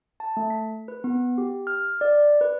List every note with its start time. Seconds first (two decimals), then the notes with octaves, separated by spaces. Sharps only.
0.20 A5
0.37 A3
0.50 B6
0.88 B4
1.04 B3
1.38 G4
1.67 F6
2.01 D5
2.41 B4